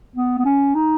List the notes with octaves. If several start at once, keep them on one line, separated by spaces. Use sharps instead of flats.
B3
B3
C#4
D#4